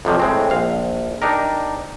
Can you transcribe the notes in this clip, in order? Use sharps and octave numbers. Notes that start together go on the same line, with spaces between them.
F2 C3 F3 F#3
A2 G#3 C4
A#1 F5
D4 D#4 G4 A#4